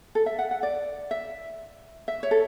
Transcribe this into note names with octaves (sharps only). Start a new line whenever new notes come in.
A4
E5
F#5
F#5
D5
E5
E5
C#5
A4